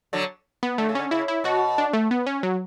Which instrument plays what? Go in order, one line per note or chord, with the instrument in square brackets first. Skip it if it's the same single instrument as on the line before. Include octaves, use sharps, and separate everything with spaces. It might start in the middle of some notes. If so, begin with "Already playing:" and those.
[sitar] D3 F#3
[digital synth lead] B3
[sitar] D3 [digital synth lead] A3
[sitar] C#3
[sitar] D3 [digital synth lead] C#4
[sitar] C#3 [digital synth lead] E4
[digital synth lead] E4
[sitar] B2 [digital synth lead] F#4
[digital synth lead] D4
A3
B3
C#4
F#3